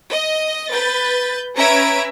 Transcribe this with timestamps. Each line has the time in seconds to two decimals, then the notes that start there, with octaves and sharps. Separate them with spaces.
0.11 D#5
0.73 B4 G6 A6
1.57 C#4 B4 E5 A#5 G#6 D7